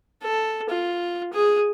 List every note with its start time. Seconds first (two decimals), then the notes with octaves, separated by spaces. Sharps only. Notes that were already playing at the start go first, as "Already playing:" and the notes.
0.22 A4
0.70 F4
1.33 G#4